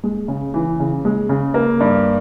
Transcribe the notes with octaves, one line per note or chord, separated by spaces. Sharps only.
G#3
C#3
E3
C#3
G#3
C#3
A#3
G2